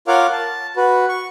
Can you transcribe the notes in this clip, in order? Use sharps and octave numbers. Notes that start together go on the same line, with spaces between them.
F4 A#4 C#5 F5 F#5 D6
A5
F#4 B4
C#6